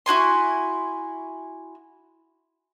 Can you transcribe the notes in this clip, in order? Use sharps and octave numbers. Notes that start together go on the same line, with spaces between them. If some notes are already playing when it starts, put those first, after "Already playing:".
E4 F#4 G#5 C6